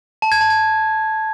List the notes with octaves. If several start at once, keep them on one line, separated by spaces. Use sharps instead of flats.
A5
G#6
A5
G#6